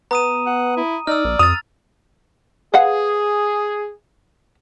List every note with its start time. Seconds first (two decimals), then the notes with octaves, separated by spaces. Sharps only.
0.11 B3 A#5 D#6 D#7
0.46 F#5
0.77 E4
1.07 D#4 D5 E6 F6
1.25 A#1
1.39 F2 D#6 A6 F7
2.74 G#4 B4 F5 F#5